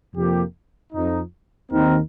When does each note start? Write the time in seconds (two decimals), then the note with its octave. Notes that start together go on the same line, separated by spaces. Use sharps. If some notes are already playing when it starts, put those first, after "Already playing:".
0.15 F2 C3 F3 A#3 G4
0.93 F2 F3 D#4
1.72 D#2 D#3 C4 D#4 A#4